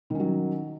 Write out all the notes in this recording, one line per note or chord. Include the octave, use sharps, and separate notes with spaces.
D#3 F#3 C#4